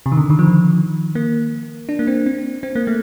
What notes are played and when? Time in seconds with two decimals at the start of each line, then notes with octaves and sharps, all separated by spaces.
0.06 C3
0.12 D#3
0.17 D3
0.30 D#3
0.39 F3
0.47 D#3
1.15 A#3
1.89 D4
1.99 A#3
2.07 C4
2.26 C4
2.63 C4
2.75 A#3
2.87 A3